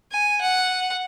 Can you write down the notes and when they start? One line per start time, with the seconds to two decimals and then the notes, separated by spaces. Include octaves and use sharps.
0.12 G#5
0.41 F#5